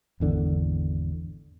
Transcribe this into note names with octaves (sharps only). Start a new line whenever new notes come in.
G#1 E2 D3